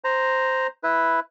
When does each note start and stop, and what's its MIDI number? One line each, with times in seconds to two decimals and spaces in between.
0.04 0.67 72
0.04 0.67 82
0.83 1.20 64
0.83 1.20 71